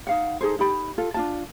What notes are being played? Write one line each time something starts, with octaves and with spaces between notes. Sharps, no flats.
D#4 F5 F#5
D#4 G#4 A4 C5
D#4 G4 B5
F4 A4
D4 F4 A5